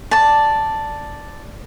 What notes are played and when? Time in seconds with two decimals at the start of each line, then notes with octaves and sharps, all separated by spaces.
0.11 D5 A5